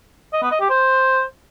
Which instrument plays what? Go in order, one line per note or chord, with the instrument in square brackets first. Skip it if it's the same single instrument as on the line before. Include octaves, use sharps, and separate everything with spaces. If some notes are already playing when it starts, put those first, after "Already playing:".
[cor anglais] D#5
B3
D#5
G4
C5